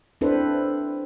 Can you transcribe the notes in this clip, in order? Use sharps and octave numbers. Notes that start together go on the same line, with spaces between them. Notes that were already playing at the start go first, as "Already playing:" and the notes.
C4 D4 E4 A4 B4 C5